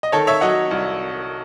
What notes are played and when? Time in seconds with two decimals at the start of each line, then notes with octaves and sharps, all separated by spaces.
0.03 D#5
0.12 D#3 A4 C#5
0.27 C#5 E5
0.41 F#3 D#5 F#5
0.71 C2